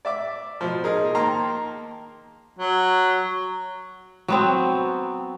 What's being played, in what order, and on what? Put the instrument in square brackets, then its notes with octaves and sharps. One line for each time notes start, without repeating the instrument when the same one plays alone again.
[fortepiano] D5 E5 D6
B2 F3
D#4 G#4 A#4
D#3 A#3 G5 A5 A#5 C6
[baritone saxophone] F#3
[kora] F#3 B3 C4